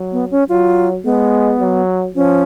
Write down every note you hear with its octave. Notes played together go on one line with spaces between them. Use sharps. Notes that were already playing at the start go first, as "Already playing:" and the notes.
Already playing: F#3
B3
C#4
F#3 F4
G#3 B3
F#3
F3 C#4